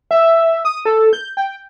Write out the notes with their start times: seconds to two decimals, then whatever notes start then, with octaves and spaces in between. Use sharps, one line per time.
0.11 E5
0.65 D#6
0.85 A4
1.13 G6
1.37 G5